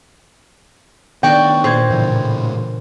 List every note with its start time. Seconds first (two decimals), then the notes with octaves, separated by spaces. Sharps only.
1.23 D#3 B3 D4 F#4 D5 G5
1.64 A#2 C5 G#6
1.90 A2 C#3 E3